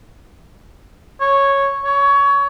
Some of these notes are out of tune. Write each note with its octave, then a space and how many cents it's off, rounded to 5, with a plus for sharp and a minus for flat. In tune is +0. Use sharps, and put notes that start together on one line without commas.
C#5 -5
C#5 +20